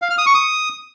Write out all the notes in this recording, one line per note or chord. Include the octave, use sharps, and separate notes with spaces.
F5
F6
D#6
C#6
D#6